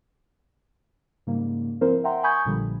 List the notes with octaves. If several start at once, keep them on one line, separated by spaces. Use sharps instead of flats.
G#2 C#3 G3 A#3
F3 C4 E4 A#4 C5
E5 F#5 G5 A#5 C6
G#5 B5 C#6 D#6 G6 G#6
A#1 A#2 D3 F3 G3